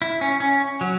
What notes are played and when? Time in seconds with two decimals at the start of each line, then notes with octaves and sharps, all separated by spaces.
0.02 E4
0.21 C#4
0.40 C#4
0.81 F#3